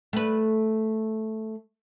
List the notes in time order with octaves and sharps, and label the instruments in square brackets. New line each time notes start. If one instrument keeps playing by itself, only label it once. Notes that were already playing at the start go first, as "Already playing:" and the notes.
[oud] A3 B4